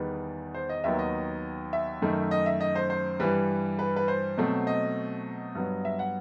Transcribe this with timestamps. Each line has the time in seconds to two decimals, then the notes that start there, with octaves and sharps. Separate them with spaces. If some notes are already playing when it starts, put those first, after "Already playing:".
Already playing: E2 D#3 G3 B3 B4
0.54 C5
0.69 D#5
0.84 D#2 D#3 F#3 B3 E5
0.99 D#5
1.73 E5
2.02 F#2 D#3 A3
2.31 D#5
2.46 E5
2.61 D#5
2.75 C5
2.90 C5
3.20 G2 E3 G3 B4
3.79 B4
3.96 B4
4.08 C5
4.38 B2 F#3 A3 C4
4.67 D#5
5.55 G2 F#3 B3
5.85 E5
5.99 F#5